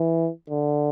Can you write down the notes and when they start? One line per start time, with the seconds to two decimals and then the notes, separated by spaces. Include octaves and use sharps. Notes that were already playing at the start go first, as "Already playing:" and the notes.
Already playing: E3
0.50 D3